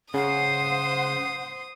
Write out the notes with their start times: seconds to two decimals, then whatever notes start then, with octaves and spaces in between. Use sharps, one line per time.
0.14 C#3 C5 F#5 D#6